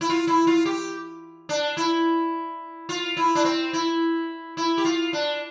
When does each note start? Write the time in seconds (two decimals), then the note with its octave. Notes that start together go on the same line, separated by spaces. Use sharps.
0.01 E4
0.09 F4
0.27 E4
0.47 F4
0.65 G4
1.49 D4
1.77 E4
2.89 F4
3.17 E4
3.35 D4
3.45 C4
3.73 E4
4.57 E4
4.78 G4
4.85 F4
5.13 D4